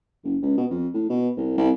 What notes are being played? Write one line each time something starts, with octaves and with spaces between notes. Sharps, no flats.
F#1
C#2
B2
F2
A2
B2
C2
C2